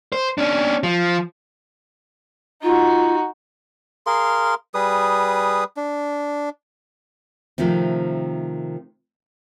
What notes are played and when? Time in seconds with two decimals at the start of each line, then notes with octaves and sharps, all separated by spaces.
0.12 C5
0.38 C#4 D4
0.83 F3
2.63 D#4 F4 F#4
4.06 G#4 A#4 F5 C6
4.74 G3 G#4 B4 D#6
5.77 D4
7.58 C3 D#3 F3 A3 C4